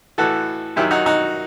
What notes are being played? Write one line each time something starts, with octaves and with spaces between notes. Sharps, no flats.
A2 E3 F#4 A4
F#2 D#3 F#3 E4 G4
D#4 F#4
D#4 F#4